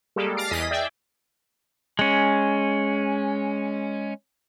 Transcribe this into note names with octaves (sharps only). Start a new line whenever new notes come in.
G3 G#3 A#3 G4 A4
D6 F6 A6 A#6 C7 D7
E2 G#4 D#5 D#6 B6 D#7
G#4 D5 E5 G5
G#3 C#4